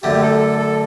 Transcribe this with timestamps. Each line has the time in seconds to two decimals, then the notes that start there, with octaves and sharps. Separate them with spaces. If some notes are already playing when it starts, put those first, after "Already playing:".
0.02 F#2 D3 A3 G4
0.13 G4
0.22 A4
0.40 A4
0.59 A4